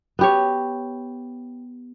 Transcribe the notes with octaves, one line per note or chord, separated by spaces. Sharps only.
B3 G4 C#5